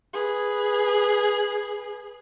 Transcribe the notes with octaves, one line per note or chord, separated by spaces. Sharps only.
G#4 B4